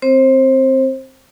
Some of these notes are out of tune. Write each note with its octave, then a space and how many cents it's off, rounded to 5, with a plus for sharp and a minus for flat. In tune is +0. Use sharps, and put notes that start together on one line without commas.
C4 +0 C5 +25